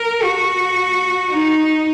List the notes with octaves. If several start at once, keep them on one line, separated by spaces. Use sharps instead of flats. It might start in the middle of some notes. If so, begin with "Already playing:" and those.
Already playing: A#4
F#4
D#4